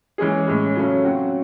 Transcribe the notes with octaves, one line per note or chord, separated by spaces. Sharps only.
E3 G#3 C#4 G#4
A2 G#3 C#4
C#3 F#3 A3 C#4
C#3 F#3 C4 F#4